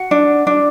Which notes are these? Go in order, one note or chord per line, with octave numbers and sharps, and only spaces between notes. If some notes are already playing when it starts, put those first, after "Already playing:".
Already playing: F#4 F#5
D4
D4